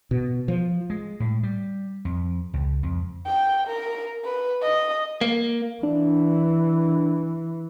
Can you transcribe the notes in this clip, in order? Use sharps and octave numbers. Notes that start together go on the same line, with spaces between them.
B2
F3
G#3
A2
G3
F2
C#2
F2
G5
A#4
B4
D#5
A#3
E3 D4